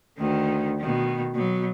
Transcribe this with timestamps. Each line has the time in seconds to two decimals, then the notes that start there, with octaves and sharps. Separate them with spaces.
0.18 D2 D#3
0.79 B2 D#3
1.35 B2 F#3